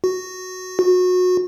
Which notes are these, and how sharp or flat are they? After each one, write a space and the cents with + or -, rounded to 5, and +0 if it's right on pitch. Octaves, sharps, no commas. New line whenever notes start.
F#4 +0
F#4 -25